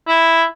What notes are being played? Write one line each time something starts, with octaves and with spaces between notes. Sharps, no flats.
E4